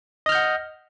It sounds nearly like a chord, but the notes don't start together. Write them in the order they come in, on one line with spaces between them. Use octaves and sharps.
D#5 F6 G6 F#5